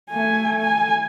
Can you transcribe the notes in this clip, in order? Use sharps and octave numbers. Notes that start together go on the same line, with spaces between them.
A3 G#5
G#5